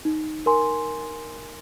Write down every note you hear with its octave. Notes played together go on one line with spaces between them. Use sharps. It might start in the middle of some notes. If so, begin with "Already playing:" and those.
D#4
A#4 G#5 C6